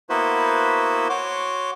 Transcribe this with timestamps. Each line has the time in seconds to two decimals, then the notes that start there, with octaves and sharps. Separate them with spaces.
0.10 A#3 B3 E4 F#4 B4 C5
1.10 F#4 C#5 C6 D6